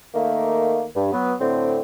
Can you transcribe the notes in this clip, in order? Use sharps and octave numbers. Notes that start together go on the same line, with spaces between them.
D#3 A3 A#3
G2
F#3 B3
A2 D3 C4